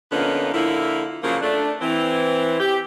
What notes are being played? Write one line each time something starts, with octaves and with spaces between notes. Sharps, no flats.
D3 F3 A#3 B3 C#4 D#4
D3 F3 A#3 E4
C#3 F3 F#3 A#3
A3 D4
E3 C4
G4